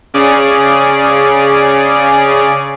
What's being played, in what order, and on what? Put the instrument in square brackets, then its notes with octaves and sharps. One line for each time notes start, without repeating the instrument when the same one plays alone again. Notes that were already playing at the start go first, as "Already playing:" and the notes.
[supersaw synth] C#3 C#4 G#4 D5